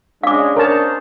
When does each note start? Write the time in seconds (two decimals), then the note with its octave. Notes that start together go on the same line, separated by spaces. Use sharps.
0.23 G#3 C#4 D4 F5 D6
0.56 D#4 G#4 A#4 C5 C#5 A5